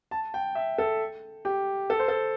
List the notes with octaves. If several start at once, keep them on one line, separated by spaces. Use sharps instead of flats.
A5
G5
E5
A4
G4
A4
C5
A4